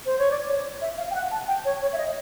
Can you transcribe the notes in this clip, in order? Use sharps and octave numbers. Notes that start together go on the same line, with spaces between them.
C5
C#5
D5
C#5
E5
F5
G5
F#5
A5
G5
C#5
C#5
E5
D#5